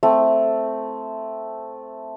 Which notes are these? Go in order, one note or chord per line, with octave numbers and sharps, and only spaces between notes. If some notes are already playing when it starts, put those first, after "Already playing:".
A3 C4